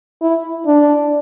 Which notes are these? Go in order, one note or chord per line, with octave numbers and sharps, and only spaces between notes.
E4
D4